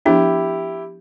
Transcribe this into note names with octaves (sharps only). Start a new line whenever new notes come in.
F3 B3 D4 E4 G4